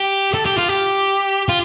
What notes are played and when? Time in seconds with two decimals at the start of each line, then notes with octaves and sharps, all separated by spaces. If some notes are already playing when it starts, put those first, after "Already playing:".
Already playing: G4
0.34 A4
0.46 G4
0.58 F4
0.69 G4
1.49 F4